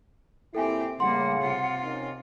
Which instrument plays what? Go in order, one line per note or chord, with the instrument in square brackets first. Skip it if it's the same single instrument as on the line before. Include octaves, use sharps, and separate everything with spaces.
[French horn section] F#2 A#2 E4 [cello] C4 G4 [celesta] A4 G5 G#5
[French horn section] A2 C#3 [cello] G3 A#3 [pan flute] F#5 [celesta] C6
[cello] C3 F4
[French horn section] D#3 C#4